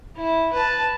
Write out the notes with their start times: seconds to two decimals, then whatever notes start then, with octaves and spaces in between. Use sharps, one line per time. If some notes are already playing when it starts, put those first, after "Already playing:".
0.16 E4
0.53 B4 A5